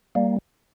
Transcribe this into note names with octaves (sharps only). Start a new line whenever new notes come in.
G3 A#3